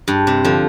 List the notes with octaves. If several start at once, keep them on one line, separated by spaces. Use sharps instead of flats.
G2
C3
D3 F3